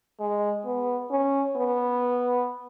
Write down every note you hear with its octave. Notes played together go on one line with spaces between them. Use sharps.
G#3
B3
C#4
B3